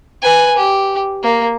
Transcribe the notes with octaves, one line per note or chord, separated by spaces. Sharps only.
B4 G#5
G4
A#3